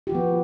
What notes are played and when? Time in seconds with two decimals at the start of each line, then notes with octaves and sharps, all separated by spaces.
0.07 G4
0.10 F#4
0.12 F3
0.15 B3